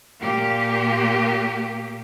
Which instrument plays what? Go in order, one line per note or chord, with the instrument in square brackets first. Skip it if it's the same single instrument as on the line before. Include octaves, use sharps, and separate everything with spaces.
[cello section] A#2 A#3 G4